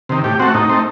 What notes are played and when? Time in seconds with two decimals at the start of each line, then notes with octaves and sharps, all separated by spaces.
0.09 C3 D#3
0.24 A2 G4
0.39 A3 C4 F#4
0.54 A2 D#4
0.69 A3 C4